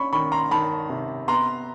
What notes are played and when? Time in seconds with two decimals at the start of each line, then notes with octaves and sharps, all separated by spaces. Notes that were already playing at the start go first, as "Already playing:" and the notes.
Already playing: C#4 B5 C#6
0.13 D#3 B5 C#6
0.32 A#5 C6
0.51 D#3 A5 B5
0.89 C3
1.28 B3 A#5 C6